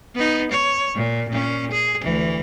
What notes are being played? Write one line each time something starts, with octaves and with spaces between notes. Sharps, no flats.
B3 D#4
C#5
A#2
A#2 C#4
G#4
D2 E3